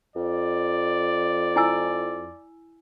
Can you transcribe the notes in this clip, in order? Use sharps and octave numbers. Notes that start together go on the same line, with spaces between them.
F2 D5
E4 G#5 E6